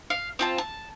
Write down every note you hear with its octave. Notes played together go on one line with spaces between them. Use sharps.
F5
C4 F4 A5
A5